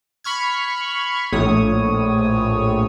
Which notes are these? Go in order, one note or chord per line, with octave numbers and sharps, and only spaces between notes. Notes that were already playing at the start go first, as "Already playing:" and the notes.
B5 C#6 F6 G#6
A#1 A2 C#5 D#6